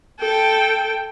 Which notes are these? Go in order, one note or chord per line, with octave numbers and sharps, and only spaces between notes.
A4 G5